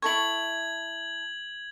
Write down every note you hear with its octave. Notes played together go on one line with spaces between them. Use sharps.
E4 A4 C#6 G#6 F#7